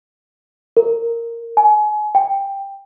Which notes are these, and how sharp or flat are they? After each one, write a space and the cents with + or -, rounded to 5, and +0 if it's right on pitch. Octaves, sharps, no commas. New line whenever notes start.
A#4 -10
G#5 +30
G5 +10